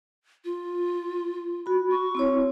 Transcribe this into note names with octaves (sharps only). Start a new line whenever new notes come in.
F4
F#4 B5
C#6
C4 E4 C#5